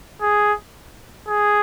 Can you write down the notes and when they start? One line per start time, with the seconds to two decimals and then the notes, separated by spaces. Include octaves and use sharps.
0.21 G#4
1.27 G#4